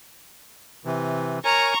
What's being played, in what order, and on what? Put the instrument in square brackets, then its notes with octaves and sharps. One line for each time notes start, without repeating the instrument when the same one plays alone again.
[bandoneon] C3 E3
[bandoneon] A#4 C#5 G#5 [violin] A#5 C#6